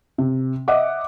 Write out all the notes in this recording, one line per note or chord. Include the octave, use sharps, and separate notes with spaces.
C3
D#5 E5 F#5 D6